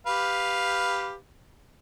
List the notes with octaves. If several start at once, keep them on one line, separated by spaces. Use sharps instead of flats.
G4 B4 F5